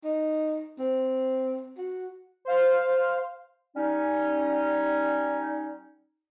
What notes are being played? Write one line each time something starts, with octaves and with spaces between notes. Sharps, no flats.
D#4
C4
F#4
C5 F5
G3 C#4 D#4